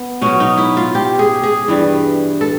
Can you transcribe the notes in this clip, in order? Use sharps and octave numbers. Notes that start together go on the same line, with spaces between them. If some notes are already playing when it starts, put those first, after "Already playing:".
Already playing: B3
B2 F#3 C#4
D#4
E4
F4
G4
G#4
G#4
G2 E3 G3
A4